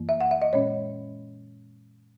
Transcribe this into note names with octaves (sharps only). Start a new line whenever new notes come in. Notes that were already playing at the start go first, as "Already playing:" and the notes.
Already playing: F#2 E3 A#3
E5
F#5
E5
D#5
A#2 G#3 C#4 C#5